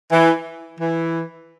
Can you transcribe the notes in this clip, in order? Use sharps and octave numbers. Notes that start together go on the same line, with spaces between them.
E3
E3